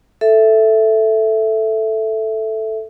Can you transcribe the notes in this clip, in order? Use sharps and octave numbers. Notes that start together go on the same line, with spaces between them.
A4 E5